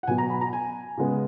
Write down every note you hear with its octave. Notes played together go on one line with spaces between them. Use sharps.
F#5
B2 F#3 B3 G#5
A#5
B5
A#5
G#5
C#3 G#3 B3